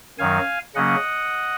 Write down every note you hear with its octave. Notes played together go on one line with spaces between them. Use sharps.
F#2 D#3 F#3 F5 G#5
C#3 F#3 A#3 C#4 D#5 F#5